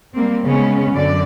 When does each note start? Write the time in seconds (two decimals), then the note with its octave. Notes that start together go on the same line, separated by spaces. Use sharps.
0.14 G3 A#3 C4
0.44 C#3 G#3 B3 C#4
0.91 F#2 D3 D5